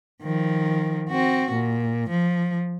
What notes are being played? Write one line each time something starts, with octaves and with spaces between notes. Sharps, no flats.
D#3 F3
C4 F#4
A#2
F3